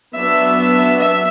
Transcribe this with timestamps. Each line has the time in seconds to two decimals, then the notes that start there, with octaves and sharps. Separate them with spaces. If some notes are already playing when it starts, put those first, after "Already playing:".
0.16 F#3 B3 D4 E5
1.00 E5